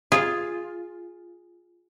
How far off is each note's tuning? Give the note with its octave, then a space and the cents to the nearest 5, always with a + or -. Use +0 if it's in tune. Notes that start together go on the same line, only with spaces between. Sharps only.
F4 +0 G#4 +0